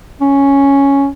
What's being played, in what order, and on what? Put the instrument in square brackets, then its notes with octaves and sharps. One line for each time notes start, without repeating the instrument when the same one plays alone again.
[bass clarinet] C#4